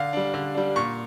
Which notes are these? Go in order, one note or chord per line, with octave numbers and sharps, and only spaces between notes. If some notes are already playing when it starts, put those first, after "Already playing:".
Already playing: D3 F5
G3 D4
D3
G3 D4
A#2 C#6